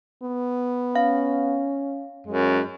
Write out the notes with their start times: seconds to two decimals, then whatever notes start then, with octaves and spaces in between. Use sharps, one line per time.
0.23 B3
0.96 C#4 F5
2.27 F#2 G#3